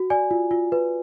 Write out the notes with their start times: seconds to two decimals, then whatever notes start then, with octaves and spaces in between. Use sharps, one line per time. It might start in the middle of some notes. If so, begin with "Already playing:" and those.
Already playing: F#4
0.10 D5 G#5
0.31 F4
0.51 F4
0.72 B4